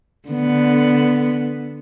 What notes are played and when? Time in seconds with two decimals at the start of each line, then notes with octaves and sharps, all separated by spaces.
0.29 D3 B3